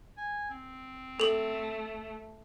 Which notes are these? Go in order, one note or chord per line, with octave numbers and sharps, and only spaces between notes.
G#5
C4
A3 A4 F#7